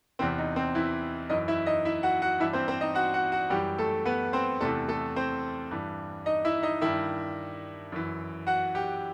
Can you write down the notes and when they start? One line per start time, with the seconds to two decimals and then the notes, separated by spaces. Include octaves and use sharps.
0.19 E2 C3 E3 C4
0.38 D#4
0.56 C4
0.75 E3 E4
1.30 F#2 E3 D#4 D#5
1.48 E4 E5
1.66 D#4 D#5
1.85 E4 E5
2.03 F#4 F#5
2.22 F#4 F#5
2.40 G2 E3 E4 E5
2.53 C4 C5
2.68 C4 C5
2.81 D#4 D#5
2.95 F#4 F#5
3.14 F#4 F#5
3.32 F#4 F#5
3.50 F#2 E3 G3 G4
3.78 A3 A4
4.05 B3 B4
4.33 C4 C5
4.61 E2 C3 E3 A3 A4
4.89 A3 A4
5.16 C4 C5
5.71 G2 E3
6.26 D#4 D#5
6.45 E4 E5
6.63 D#4 D#5
6.81 G2 D#3 E4 E5
7.92 F#2 E3
8.47 F#4 F#5
8.75 G4 G5